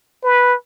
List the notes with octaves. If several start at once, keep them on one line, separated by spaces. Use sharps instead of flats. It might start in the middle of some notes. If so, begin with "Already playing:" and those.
B4